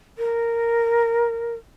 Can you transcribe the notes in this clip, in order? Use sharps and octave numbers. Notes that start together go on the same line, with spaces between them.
A#4